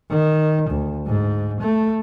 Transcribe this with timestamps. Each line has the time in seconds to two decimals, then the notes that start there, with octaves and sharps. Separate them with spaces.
0.10 D#3
0.70 D2
1.07 G#2
1.61 A3